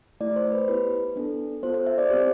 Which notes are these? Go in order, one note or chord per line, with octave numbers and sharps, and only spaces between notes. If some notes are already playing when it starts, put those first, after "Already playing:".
A3 E4 G4 D5
C5
B4
B3 E4 G4 B4
B3 D4 A4
B3 F4 A4 C5
C5
E5
D5
C4 G4 C5